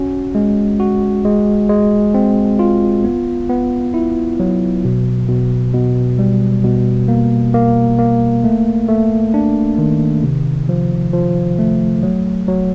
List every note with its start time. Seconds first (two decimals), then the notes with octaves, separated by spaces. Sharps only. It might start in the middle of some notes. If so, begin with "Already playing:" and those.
Already playing: C#4 F#4
0.35 G#3
0.80 F#4
1.25 G#3
1.69 G#3
2.14 C4
2.59 F4
3.04 B3
3.49 B3
3.94 E4
4.40 F#3
4.85 B2
5.29 B2
5.74 B2
6.19 G3
6.64 B2
7.08 A#3
7.54 A#3
7.99 A#3
8.44 A3
8.89 A3
9.34 D4
9.78 D#3
10.23 C3
10.69 F3
11.13 F3
11.59 A3
12.03 F#3
12.48 F#3